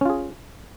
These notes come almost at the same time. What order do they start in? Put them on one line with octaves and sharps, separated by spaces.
C#4 F4 G#4